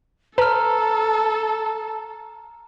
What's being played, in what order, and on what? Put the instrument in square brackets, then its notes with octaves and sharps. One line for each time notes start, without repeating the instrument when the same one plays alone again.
[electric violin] A4 [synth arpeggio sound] B4 [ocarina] A5 [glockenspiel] A#5 F6